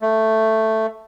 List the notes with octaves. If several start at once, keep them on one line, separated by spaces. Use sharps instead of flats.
A3